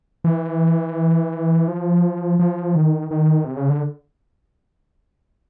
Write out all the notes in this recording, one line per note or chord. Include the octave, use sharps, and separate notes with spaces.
E3
F3
F3
D#3
D#3
C3
C#3
D3